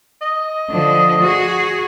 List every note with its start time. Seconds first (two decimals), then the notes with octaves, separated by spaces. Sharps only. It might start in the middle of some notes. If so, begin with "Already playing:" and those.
0.21 D#5
0.70 D3 F3
1.23 F#4 G#4